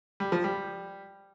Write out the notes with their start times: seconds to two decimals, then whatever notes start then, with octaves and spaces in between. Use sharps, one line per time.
0.20 G3
0.32 F3
0.44 G3